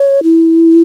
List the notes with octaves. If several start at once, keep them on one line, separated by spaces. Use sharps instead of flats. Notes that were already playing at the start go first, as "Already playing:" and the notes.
Already playing: C#5
E4